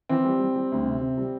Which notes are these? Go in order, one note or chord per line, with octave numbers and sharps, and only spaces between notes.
E3 C4
G3
G3
G3
D2
C3
C3
G3